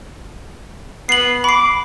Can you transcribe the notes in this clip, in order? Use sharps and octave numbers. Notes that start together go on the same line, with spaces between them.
B3 C7 F#7
B5 D6 C7